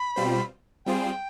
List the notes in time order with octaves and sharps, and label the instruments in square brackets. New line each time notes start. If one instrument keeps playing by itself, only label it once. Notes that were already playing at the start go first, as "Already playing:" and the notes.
Already playing: [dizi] B5
[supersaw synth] B2 G3 C4 F4 C5
[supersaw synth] G3 C4 F4 G#4 C5 [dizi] G5